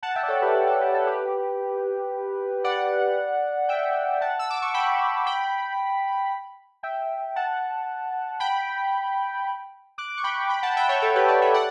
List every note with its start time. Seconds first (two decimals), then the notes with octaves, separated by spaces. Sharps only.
0.03 F#5 A5
0.15 E5 G5
0.23 D5
0.28 A4 C#5
0.42 G4 B4
0.55 A4
0.67 A4
0.81 G4 B4
0.94 A4
1.07 G4 B4
2.64 D5 F#5
3.69 E5 G5
4.21 F#5 A5
4.39 E6
4.50 D6
4.62 C#6
4.74 G5 B5
5.27 G5 B5
6.83 E5 G5
7.36 F#5 A5
8.40 G5 B5
9.98 D6 F#6
10.17 C#6
10.24 G5 B5
10.50 G5 B5
10.62 F#5 A5
10.76 E5 G5
10.89 C#5 E5
11.02 A4 C#5
11.15 G4 B4
11.28 B4 D5
11.42 C#5 E5
11.54 D5 F#5